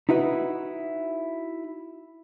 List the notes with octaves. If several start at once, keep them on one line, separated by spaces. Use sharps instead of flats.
D#4 E4 F#4 B4